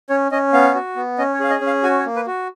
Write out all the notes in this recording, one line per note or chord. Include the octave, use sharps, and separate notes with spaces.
C#4 C#5
C#4 D#5
B3 F5
F#4
B3
C#4 D#5
C#5
G#4 F5
D#5
C#4
F5
F#4 G#5
C#5
A#3
B4
F#4